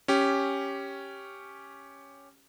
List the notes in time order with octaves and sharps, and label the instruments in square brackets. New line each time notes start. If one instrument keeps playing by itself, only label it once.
[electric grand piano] C#4 G4